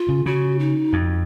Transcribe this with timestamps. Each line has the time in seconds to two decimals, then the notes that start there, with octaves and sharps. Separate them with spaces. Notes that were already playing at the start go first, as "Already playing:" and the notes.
Already playing: F4
0.09 C#3
0.26 C#3 F#4
0.59 D#4
0.93 F2